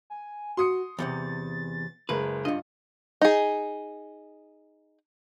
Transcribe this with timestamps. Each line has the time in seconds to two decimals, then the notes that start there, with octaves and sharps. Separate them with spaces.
0.10 G#5
0.57 F#4 C6 D#6 C#7
0.99 E2 A2 C3 A6
2.09 F#1 G#3 A#4 B4
2.45 G2 D4 F4 D#5
3.21 D#4 G#4